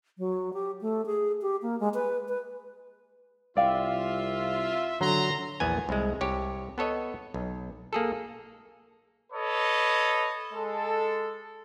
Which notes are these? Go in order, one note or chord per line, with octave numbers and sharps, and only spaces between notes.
F#3
G4
A3
G#4
G4
A#3
G#3
B4
B4
C2 F4 D5 E5 F5 G5
D3 F#3 A#5 C6
A#1 E2 B3 G#5
C2 G#3
C2 G4 C#5
B3 A4 C#5 D#5
B1
A#3 G#4 A4
A4 B4 C#5 D#5
G#3 A4